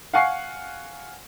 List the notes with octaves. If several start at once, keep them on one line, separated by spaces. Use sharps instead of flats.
F5 F#5 G#5 C#6 C7